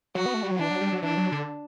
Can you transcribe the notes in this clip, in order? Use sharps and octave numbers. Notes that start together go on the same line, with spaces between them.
F#3 F#4
B3
A3
G3
F#3
E3 D4
F#3
G3
F#3
E3 D4
F#3
D3